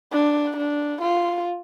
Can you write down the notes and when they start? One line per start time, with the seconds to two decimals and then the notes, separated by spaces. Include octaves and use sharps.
0.12 D4
0.57 D4
1.02 F4